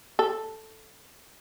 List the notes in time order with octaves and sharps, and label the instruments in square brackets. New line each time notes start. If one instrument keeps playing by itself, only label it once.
[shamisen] A4